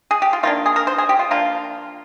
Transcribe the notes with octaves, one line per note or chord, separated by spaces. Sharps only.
G#4
G4
F4
D#3 A#3 D4 F4
G#4
A#4
C5
G#4
G4
F4
F3 A#3 D4 F4